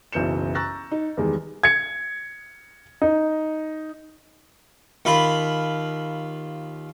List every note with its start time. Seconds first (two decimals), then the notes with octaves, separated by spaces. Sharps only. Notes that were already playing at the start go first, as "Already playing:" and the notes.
0.12 F#1 B1 E3 G6 C#7 E7
0.55 A#5 C#6 E6 F#6 A6 A#6
0.92 D#4
1.17 E2 D#3 G3 G#3
1.63 G#6 C#7
3.02 D#4
5.05 D#2 F4 B5